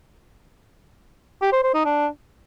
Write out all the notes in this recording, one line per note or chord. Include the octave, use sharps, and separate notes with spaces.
G4
C5
C5
D#4
D4